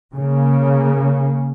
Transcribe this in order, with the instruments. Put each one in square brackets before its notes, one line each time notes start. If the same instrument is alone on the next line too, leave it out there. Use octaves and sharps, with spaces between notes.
[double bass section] C#3 A#3